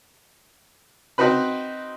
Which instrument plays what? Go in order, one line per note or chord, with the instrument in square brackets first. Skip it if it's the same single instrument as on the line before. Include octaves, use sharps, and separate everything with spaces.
[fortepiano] C4 D#4 F#4 B4 B5